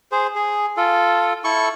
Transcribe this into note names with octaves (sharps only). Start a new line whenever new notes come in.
G#4 C5
G#4
F4 A4
E4 A4 C#6